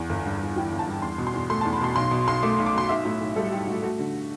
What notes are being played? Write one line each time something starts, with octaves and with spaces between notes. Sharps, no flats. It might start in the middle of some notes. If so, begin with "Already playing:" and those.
Already playing: E2
G1
G2
G1
E3 G5
G1
A5
G2
E2 C6
B2
C6
E2
A3 C6
A5
E2
B5
B2 C6
B1 C6
B2
B1 C6
A3 D6
B1
D6
B2 C6
B1 E5
A2
B1
G3 A4
B1 G4
A2 F#4
A3 F#4
D3